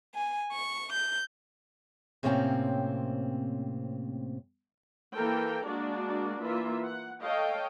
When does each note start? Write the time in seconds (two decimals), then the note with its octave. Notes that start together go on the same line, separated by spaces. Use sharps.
0.16 G#5
0.53 C#6
0.94 G6
2.23 A2 C3 A#3 C4 C#4 G5
5.15 E3 A#3 A4 A#4 G5
5.66 G#3 A#3 D4 F#4 D5
6.42 E3 A#3 F4 E5
6.86 F#5
7.23 A4 C#5 D#5 F5 G5